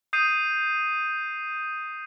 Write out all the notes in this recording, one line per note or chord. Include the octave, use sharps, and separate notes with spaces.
D#6 G6 C7 D#7